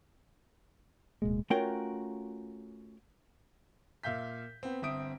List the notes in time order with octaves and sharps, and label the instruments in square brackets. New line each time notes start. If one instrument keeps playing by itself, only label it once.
[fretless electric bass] D1 B2 A#3 [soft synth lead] G#3
[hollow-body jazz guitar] A3 C#4 F4 F#4 A#4 G5
[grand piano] A#2 E5 F5 G6 B6
B3 C4
G1 C4 E5 D#6 D7